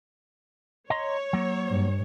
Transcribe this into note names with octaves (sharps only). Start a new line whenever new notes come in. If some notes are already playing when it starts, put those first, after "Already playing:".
C#5 D#5 A#5 C6
F#3 A#3
G2